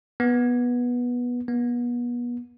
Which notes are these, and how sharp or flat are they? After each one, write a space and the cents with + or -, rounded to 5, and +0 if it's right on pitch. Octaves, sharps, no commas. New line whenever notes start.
B3 -15
B3 -35